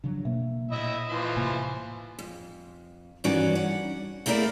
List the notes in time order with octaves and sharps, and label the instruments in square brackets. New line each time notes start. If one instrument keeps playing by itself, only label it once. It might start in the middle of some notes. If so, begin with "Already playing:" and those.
[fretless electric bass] C#3 F3 F#3 [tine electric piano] D4
[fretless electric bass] B2 [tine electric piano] A#3 E5
[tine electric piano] A#2 [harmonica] E4 D#5 E5
[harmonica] E3 F3 C6
[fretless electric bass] A2 C3 A#3 [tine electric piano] G#5
[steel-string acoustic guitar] F2
G2 D#3 E3 C#4 F#4 D5
F#5
A3 A#3 E4 G#4 A#4 D5